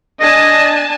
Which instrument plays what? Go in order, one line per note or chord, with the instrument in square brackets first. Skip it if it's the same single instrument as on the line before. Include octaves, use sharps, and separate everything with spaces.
[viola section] D4 G#5 A5 [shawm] D#5